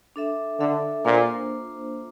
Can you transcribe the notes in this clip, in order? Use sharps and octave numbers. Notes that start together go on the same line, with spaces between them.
D4 A4 E5
D3 D4 A4 E5
A#2 A#3 D4 F4 C5